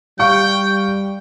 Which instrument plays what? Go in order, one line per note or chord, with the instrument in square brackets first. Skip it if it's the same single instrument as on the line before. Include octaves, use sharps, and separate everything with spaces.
[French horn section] G3 [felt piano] F5 C#6 [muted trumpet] G5